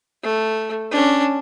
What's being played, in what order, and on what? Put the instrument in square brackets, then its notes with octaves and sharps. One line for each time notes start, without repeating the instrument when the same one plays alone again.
[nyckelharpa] A3
C#4 D4